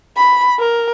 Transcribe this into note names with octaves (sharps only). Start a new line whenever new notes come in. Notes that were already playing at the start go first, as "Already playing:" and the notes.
B5
A#4